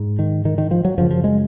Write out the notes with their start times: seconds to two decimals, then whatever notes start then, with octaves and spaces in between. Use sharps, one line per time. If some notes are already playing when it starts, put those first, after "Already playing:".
Already playing: G#2
0.19 D#3
0.45 D#3
0.58 D#3
0.71 F3
0.85 F#3
0.98 F#2 C#3 F3
1.11 F3
1.24 G#3